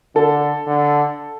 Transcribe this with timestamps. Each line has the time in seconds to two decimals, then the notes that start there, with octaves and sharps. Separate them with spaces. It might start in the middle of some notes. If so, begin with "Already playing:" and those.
0.15 D3 A4
0.66 D3